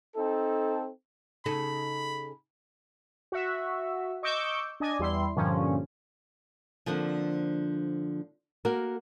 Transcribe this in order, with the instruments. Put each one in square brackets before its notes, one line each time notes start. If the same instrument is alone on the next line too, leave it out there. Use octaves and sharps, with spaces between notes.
[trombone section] C4 D#4 A4
[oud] C#3 D#4 A4 [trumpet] B5
[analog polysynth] F#4 E5
D#5 C#6 D6 E6 G6
D4 D5 D#5 G#5
E2 G3 E4 C6
G2 A#2 D3 F3 C#4
[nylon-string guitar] D3 F3 A#3 C4 D4
A#3 F#4 A#4